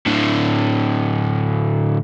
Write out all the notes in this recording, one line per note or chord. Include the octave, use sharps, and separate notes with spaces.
A2 D3